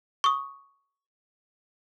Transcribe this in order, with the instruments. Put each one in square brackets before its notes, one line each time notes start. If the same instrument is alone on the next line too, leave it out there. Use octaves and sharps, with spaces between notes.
[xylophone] C#6 D#6